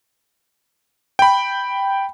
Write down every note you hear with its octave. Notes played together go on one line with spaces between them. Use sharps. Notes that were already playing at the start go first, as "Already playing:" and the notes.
G5 B5